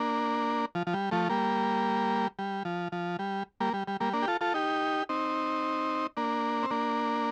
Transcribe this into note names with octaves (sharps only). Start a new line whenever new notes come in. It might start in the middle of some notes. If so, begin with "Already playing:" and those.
Already playing: A#3 D4
F3
F3
G3
F3 A3
G3 A#3
G3
F3
F3
G3
G3 A#3
G3
G3
G3 A#3
A#3 D4
G4
F4 A4
F4 A4
D#4 G4
C4 D#4
A#3 D4
C4
A#3 D4